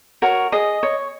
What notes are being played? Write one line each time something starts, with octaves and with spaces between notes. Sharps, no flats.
F#4 A#4 C#5
G#4 D#5
C#5